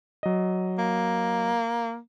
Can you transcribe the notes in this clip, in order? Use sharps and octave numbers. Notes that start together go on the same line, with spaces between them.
F#3 D#5
A#3